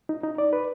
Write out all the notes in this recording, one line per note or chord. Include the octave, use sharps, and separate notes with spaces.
D#4
D#4
D5
B4